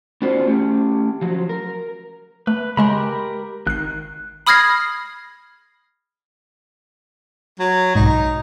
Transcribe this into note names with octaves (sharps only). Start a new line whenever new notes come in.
B3 C#4 D4 F4 F#4 C5
A3 C#4 G4
F3 F#3
A#4
A3 B4
C#3 G#3 G4 A#4 B5 C6
G#1 D#3 F#6 C7
B5 D#6 F6 G#6 A#6 C7
F#3
B1 G#2 D#4